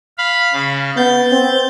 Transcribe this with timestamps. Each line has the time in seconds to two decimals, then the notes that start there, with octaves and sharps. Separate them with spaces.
0.18 F5 B5
0.53 C#3
0.97 B3 G6 A6
1.32 C4